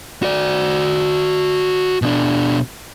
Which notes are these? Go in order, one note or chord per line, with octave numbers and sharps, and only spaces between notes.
F#4 D5
B2 D4